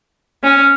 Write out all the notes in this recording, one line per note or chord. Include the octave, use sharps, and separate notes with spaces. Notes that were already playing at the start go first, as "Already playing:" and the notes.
C#4